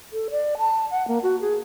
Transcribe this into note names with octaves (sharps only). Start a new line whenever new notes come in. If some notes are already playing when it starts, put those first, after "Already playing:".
A4
D5
A5
F#5
A#3
F#4
G#4